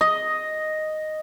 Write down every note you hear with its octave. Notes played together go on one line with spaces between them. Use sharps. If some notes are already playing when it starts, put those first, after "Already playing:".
D#5